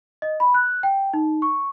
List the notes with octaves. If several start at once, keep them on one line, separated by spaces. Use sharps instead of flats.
D#5
B5
F#6
G5
D#4
C#6